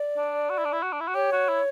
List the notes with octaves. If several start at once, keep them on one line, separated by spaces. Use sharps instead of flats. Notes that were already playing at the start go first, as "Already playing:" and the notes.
Already playing: D5
D4
F#4
E4
D4
E4
F#4
D4
E4
F#4
G4 C#5
F#4
E4